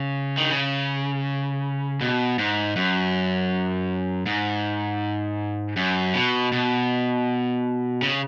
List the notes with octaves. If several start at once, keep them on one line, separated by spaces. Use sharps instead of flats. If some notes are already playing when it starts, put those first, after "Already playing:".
Already playing: C#3
D#3
C#3
B2
G#2
F#2
G#2
F#2
B2
B2
C#3